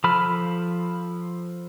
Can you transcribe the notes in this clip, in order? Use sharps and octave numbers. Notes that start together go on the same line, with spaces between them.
F3 A4 B5 F6